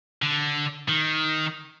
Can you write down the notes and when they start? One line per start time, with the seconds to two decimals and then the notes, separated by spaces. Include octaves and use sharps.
0.22 D3
0.88 D#3